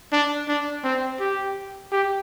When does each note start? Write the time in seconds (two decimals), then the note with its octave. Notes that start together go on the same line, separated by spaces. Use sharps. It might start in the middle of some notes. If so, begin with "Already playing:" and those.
0.12 D4
0.48 D4
0.83 C4
1.20 G4
1.92 G4